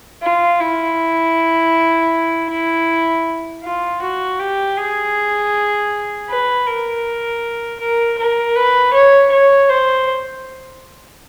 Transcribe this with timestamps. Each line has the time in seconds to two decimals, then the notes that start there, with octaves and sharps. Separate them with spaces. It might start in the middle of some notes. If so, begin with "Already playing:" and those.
0.23 F4
0.60 E4
2.50 E4
3.63 F4
4.02 F#4
4.39 G4
4.77 G#4
6.29 B4
6.67 A#4
7.80 A#4
8.18 A#4
8.56 B4
8.94 C#5
9.32 C#5
9.69 C5